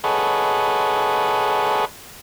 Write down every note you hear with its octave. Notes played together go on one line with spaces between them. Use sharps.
G#4 A4 B4 C#5 D#5 F#5